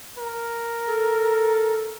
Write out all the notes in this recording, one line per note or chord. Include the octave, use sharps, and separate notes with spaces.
A#4
A4